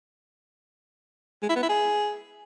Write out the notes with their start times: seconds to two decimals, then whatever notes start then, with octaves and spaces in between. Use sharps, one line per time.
1.42 G#3
1.49 E4
1.56 B3
1.63 E4
1.69 G#4